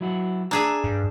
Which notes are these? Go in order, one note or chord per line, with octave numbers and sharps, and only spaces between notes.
F#3 E4 F#4
D4 G#4 E5 A#5
G2